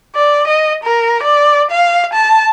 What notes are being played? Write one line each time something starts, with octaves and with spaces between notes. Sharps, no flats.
D5
D#5
A#4
D5
F5
A5